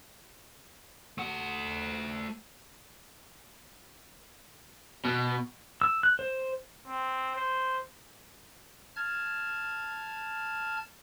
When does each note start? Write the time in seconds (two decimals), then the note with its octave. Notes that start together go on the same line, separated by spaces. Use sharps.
1.18 A3 F#5
5.05 B2
5.82 E6
6.03 F#6
6.19 C5
6.87 C4
7.36 C5
8.96 A5 F6 G#6